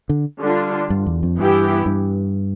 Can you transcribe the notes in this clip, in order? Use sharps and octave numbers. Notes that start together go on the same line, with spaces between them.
D3
D3 G3 D4 F4
G2
E2
F2
G2 E3 B3 E4 G4
G2